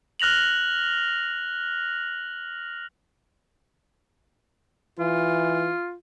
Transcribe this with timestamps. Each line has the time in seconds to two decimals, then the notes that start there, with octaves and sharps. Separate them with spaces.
0.20 F6 F#6 A#6 F7 F#7
4.99 E3 F4